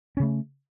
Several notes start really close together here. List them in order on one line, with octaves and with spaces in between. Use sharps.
C#4 C#3 A3